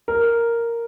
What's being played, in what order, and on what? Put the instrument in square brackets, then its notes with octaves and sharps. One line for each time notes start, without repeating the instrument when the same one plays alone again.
[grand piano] A#4